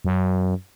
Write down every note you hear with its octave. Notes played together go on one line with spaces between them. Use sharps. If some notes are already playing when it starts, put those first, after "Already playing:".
F#2